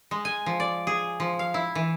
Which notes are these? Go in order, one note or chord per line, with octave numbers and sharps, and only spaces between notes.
G#3
G#5
F3
D5
G#4
F3
F5
E4
E3